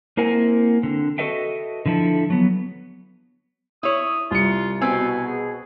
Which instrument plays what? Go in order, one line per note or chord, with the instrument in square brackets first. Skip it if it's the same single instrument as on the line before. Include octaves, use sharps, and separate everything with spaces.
[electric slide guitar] A#3 C4 E4 A#4 F#5 G#5
D3 C4
F#4 A4 B4 D#5 E5 G5
D3 F3 E4 A4
F#3 B3
[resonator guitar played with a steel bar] E4 C#5 [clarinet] D#6
[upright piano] C2 C#7 [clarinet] F4
[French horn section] B2 F#4 [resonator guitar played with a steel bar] B3 C4 [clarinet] G#5
[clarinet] G#4